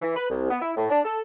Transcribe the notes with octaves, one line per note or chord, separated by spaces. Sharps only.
E3
B4
C2
B3
E4
A2
D4
A4